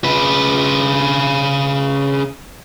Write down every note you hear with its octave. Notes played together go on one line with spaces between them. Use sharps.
C#3 B4